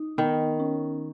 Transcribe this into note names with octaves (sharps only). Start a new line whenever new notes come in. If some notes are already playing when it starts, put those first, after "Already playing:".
Already playing: D#4
D#3 B3
C#4